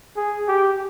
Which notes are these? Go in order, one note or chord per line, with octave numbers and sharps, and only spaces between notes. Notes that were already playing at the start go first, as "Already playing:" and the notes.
G#4
G4